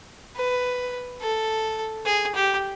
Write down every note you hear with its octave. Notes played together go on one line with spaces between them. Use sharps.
B4
A4
G#4
G4